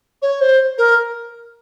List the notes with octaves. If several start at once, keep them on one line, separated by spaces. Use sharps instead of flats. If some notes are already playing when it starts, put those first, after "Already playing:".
C#5
C5
A#4